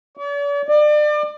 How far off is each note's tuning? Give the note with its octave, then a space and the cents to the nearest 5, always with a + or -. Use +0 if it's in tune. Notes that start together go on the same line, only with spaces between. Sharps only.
D5 -45
D5 +35